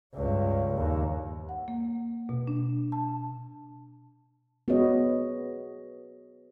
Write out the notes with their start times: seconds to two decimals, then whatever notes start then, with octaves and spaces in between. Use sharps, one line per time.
0.14 C#2 G2
0.76 D#2
1.49 F#5
1.68 A#3
2.29 B2
2.48 D4
2.92 A5
4.68 B3 F#4 G#4 B4 C#5 D#5